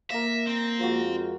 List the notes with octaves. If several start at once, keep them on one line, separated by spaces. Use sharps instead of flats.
A#3 A#4 D5 E5 A#6
C4
F2 G#3 F4 F#4 C5